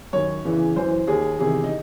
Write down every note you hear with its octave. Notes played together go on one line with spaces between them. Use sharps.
F#2 D#3 C#5
E2 C#3 E3
F#2 E3 C5
D#2 D#3 G#4
E2 C3 D#3 G#4
D#4